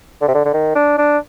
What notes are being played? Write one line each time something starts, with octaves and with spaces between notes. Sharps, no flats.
D3
C3
D3
D3
D#3
D4
D4